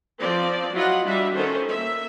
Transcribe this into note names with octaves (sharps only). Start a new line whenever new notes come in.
F3 C4 D5
F#3 E4 F4 D#5 F#5
G3 D4 F#4 E5
D#3 C#4 A4 C5
A#3 E5